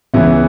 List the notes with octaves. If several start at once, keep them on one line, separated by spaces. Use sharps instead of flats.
C#2 C#3 E3 B3 E4